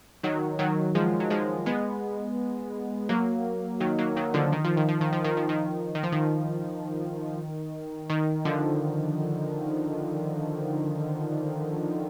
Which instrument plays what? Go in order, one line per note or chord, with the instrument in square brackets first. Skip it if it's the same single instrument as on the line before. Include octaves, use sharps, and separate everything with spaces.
[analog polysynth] D#3 F#3
D#3 F#3
F3 G#3
F#3
F3 G#3
G#3 B3
F#3 A#3
D#3 F#3
F#3 A#3
D#3 F#3
D3 F3
D#3
F3
D#3
F3
D#3
F3
D#3
F3
D#3
D#3
F3
D#3
D#3
D3 F3